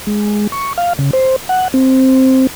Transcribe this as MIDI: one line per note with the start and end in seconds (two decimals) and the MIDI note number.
0.07 0.47 56
0.52 0.73 85
0.78 0.93 77
0.99 1.11 49
1.13 1.36 72
1.49 1.68 78
1.74 2.47 60